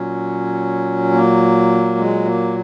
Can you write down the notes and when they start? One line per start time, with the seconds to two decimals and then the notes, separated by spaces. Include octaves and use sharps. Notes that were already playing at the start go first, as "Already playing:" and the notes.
Already playing: A#2 F#3 C#4
1.13 A#3
1.97 G#3
2.25 A#3